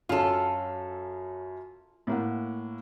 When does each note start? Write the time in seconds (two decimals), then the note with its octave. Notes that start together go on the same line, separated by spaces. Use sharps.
0.09 F#2 F#3 C#4 F4 A4
2.07 A2 A#3 F#5